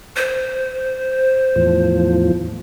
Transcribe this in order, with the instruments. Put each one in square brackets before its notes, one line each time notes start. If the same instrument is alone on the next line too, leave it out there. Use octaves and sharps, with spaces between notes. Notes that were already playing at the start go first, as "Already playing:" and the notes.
[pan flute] C5
[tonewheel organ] E2 A2 F3